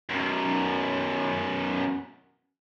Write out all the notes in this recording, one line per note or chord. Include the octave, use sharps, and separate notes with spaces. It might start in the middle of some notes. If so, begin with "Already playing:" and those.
F#2 B2